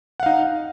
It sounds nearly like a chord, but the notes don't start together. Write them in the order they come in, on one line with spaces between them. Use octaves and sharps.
F#5 F5 D#4